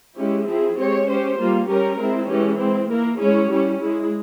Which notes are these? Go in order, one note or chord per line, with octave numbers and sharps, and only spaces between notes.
G#3 C#4 E4 G4
F3 C4 E4 G#4
G#3 C4 G4 C#5
C#4 G4 C5
G3 A#3 F4
G3 C#4 G4 A#4
G#3 C4 E4
E3 G#3 C#4 G4
G#3 C4 E4
A#3 E4 A#4
G#3 C#4 E4 G#4 C#5
G3 C#4 E4 G4
G#3 E4 G#4